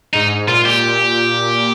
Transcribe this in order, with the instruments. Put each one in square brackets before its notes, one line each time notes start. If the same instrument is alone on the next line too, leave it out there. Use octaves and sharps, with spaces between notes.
[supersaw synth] G#2 [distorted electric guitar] D#4
[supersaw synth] A#2 [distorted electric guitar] F4
[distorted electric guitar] G4